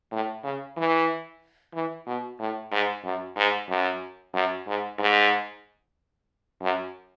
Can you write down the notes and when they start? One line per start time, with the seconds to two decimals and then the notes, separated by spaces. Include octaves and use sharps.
0.12 A2
0.44 C#3
0.77 E3
1.74 E3
2.07 B2
2.40 A2
2.72 G#2
3.04 F#2
3.37 G#2
3.69 F#2
4.34 F#2
4.67 G#2
4.99 G#2
6.62 F#2